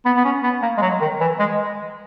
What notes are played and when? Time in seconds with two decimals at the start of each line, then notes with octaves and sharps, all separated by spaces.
0.05 B3
0.17 B3
0.25 C#4
0.43 B3
0.62 A#3
0.78 G#3
0.82 F#3
1.01 D#3
1.20 E3
1.39 G#3